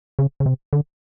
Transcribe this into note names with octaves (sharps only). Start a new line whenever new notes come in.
C#3
C#3
C3
D3